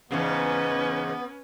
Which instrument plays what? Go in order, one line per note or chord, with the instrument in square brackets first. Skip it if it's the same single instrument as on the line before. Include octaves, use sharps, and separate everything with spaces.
[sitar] E2 G#2 C#3 [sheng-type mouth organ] B3 [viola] C#4 B4